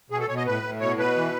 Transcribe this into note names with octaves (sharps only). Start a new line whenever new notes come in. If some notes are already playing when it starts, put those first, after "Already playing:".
B2 G#4
A4
B2 C#5
D#5
A2 B4
A2
B2 C#5
B2 B4
E3